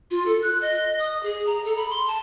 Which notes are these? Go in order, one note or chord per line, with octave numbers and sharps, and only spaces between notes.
F4
A4
F#6
D#5
D#6
G#4
A#5
A4
B5
C6
A5